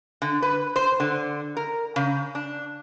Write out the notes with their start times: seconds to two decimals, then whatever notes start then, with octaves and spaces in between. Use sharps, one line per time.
0.22 D3
0.42 B4
0.76 C5
1.00 D3
1.57 A#4
1.96 C#3
2.35 D4